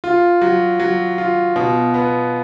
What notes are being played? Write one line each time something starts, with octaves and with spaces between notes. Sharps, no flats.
F4
F#3
F#3
F4
B2
B3